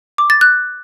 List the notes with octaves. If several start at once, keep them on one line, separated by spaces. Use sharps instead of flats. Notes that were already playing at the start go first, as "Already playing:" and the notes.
D6
A6
F#6